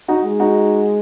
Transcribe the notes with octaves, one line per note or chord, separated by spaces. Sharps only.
D#4 F#4
G#3
D#4 F#4